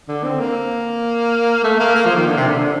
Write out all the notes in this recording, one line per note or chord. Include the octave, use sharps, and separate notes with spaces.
D3
C4
A#3
A3
A#3
A#3
F3
D#3
D3
C3
D3
D3